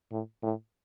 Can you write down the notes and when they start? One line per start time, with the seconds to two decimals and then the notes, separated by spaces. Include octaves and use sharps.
0.11 A2
0.43 A2